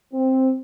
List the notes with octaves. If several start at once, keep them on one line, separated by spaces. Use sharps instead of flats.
C4